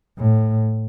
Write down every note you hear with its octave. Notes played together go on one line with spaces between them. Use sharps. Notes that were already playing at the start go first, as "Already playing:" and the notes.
A2